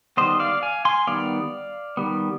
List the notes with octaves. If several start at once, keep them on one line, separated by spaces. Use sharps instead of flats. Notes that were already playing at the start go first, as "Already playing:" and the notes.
D#3 G3 B3 C5 D#5
D5 F5
F5 G#5
G#5 C6
D#3 G3 B3 D5 F5
D#3 G3 B3